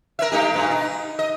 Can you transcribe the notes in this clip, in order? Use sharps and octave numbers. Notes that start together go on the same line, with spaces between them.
A#4 C#5 E5
A3 D#4 G4
G2 B2
D#4
D#5